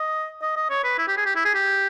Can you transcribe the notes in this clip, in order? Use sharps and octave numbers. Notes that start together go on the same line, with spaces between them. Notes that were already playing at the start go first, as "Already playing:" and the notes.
Already playing: D#5
D#5
D#5
C#5
B4
E4
G4
G#4
G4
E4
G#4
G4